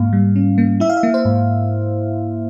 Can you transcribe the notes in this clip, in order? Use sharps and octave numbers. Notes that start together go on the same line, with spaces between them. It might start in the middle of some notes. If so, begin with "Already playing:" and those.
Already playing: G#2 A#3 F5
G3
C#4
A#3
E4 E5
F5
E5
A#3
C5
G#2